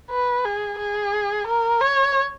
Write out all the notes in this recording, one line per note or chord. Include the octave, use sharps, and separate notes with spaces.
B4
G#4
G#4
A#4
C#5